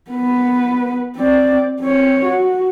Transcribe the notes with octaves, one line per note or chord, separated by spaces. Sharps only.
B3 B4
C4 D5
C4 C#5
F#4